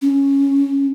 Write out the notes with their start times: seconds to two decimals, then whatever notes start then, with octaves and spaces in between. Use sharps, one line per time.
0.02 C#4